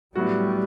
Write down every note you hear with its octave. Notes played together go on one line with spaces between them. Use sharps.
A2 F#3 G3 B3 F#4